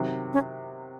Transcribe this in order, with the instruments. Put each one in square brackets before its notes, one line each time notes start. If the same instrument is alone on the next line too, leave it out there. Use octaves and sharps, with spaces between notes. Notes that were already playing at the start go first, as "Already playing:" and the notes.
Already playing: [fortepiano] C3 D#3 F#3
[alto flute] C#4